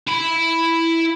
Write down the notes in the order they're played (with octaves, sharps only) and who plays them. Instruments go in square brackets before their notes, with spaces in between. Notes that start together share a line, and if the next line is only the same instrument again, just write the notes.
[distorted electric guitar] E4 B5